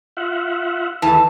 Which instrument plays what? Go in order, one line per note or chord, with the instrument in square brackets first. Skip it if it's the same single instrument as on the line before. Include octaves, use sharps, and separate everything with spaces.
[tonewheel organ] F4 E5 F#5
[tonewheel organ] D#2 E5 [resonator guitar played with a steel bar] E3 [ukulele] A4 A5